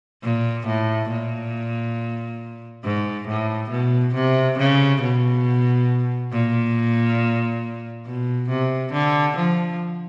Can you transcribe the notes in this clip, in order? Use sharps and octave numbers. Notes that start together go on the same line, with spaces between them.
A#2
A2
A#2
G#2
A2
B2
C3
C#3
B2
A#2
B2
C3
D3
F3